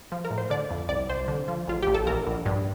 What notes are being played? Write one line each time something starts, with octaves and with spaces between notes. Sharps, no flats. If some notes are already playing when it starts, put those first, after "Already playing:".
F3
A#4
A2
C5
D3 D5
F2
C2 D5
C2 C5
D3
F3
A1 F4
A1 G4
A4
A#1 A#4
A#1
G2